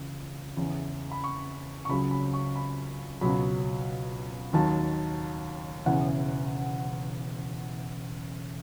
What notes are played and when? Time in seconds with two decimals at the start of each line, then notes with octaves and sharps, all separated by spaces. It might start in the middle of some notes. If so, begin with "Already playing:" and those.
Already playing: C#2 C#3 E3
0.57 E2 C#3 E3
1.12 B5
1.24 C#6
1.85 C#6
1.89 C#2 C#3 F#3 B5
2.11 B5
2.33 C#6
2.56 B5
3.21 C#2 B2 F#3 B5
4.53 D#2 D#3 F#3 A5
5.86 E1 E2 C#3 E3 F#5